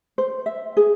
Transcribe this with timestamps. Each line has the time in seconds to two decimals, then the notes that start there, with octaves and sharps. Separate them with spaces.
0.18 C5
0.46 E5
0.77 G#4